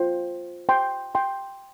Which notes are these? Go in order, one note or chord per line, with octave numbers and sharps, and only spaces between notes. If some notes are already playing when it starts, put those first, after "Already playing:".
Already playing: F4 C5 G5
G5 C6
G5 C6